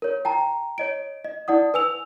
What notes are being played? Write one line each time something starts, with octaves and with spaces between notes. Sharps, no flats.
A#4 C#5
G5 A5 A#5
C#5 D#5 D7
D#5
E4 D5 F#5 D#6
B4 G#5 E6 F7